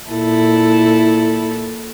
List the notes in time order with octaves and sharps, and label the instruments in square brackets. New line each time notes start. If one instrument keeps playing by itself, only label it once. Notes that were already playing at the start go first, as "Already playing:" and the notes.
[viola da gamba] A#2 E4 A4